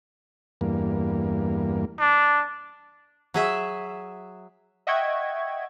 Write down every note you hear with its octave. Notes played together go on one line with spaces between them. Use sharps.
E2 G2 A#3
D4
F#3 G#4 E5
D#5 E5 F#5 G5 C#6 G#6